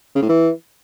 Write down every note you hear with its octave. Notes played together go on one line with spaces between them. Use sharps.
C#3
A2
E3